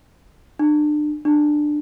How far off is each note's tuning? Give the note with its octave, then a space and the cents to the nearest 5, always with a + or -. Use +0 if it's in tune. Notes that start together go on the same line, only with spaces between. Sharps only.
D4 +35
D4 +20